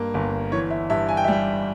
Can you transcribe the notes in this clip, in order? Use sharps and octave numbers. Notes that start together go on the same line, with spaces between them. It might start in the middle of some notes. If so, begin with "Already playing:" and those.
Already playing: G2 A#3
G1
E3 C#5
E5
G2 E5
G#5
G5
E5
G3 G5